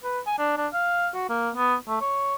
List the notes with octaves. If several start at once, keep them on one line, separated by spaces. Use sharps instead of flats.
B4
G#5
D4
D4
F5
F#4
A#3
B3
A3
C#5